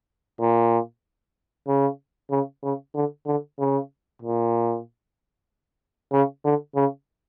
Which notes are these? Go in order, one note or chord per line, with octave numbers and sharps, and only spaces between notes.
A#2
C#3
C#3
C#3
D3
D3
C#3
A#2
C#3
D3
C#3